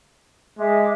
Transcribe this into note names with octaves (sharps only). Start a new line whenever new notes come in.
G#3 E5 D6